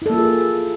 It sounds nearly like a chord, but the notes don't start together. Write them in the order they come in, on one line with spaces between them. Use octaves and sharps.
E4 A4 A#3 F4 G#4